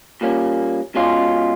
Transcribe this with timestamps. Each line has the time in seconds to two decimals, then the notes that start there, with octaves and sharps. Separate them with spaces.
0.21 A#2 G3 A#3 C#4
0.95 B2 G#3 C#4 F4